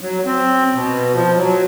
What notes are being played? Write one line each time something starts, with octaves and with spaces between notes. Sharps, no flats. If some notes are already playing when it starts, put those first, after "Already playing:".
F#3
C4
B2
F3
F#3